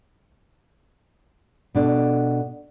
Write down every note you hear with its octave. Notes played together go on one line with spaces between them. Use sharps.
B2 D4 A4